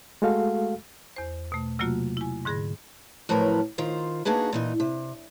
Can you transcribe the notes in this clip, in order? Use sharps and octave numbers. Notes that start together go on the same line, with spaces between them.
G#3 A3 F#4 A4 F5
E2 C5
B2 A3
C3 F#3 A3 A#3 F4 F#4
E4 G#5
G#2 D3 G#4 B5 A#6
A2 F3 F#3 A#4 B4
D#3 F4 C5
A#3 D4 D#4 F#4 G#4 B4
A#2 E3 D#4
C3